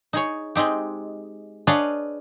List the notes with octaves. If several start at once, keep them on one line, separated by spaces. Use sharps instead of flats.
D#4 G#4 C#5
G#3 C4 D#4 G4
D4 G#4 B4 C#5 D#5 F5